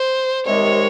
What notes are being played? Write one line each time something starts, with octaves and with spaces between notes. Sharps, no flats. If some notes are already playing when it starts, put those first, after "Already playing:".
Already playing: C5
C2 C3 D#3 G#3 C#5